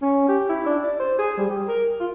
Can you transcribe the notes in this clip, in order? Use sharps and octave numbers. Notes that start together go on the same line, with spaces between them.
C#4
G4
E4
D4
D5
C5
G#4
G3
G4
A#4
F4